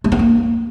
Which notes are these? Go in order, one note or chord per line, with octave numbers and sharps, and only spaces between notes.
A3
B3
A#3